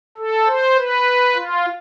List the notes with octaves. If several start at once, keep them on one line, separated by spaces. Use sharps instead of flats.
A4
C5
B4
F4